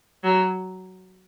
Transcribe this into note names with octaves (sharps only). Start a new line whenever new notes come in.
F#3